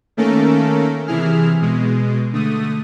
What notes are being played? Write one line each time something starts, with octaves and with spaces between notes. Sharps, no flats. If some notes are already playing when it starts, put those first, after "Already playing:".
D#3 A3 A#3 C#4 A4 A#4
C3 E3 E4 G#4 F6
B2 G#3
D3 A3 D#6